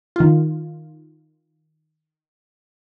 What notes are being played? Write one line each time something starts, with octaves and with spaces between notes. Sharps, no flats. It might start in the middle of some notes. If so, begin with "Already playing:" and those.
D#3 F4